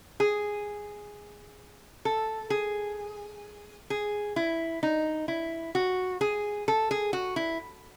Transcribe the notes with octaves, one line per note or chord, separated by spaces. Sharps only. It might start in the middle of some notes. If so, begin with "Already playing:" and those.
G#4
A4
G#4
G#4
E4
D#4
E4
F#4
G#4
A4
G#4
F#4
E4